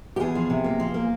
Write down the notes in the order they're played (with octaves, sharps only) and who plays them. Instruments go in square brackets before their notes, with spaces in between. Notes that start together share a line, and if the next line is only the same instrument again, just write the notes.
[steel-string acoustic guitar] G4
E2 G#4
F3
C3
A#3
F3
A#3